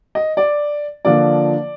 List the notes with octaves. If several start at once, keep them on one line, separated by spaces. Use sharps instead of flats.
D#5
D5
D3 F3 A#3 D4 F4 D5